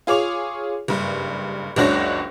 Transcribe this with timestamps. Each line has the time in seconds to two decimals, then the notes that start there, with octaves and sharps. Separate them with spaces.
0.07 F4 G#4 C#5 D6 F7
0.88 F#1 G2
1.76 F#1 C#2 D4 F#4 C#5 A#6